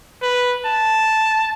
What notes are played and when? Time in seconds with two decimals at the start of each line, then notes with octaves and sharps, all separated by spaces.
0.23 B4
0.65 A5